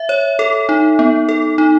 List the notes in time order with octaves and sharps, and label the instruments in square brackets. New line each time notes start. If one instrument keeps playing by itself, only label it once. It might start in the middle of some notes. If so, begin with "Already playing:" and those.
Already playing: [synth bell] E5
C#5
A4
D#4
B3
A4
D#4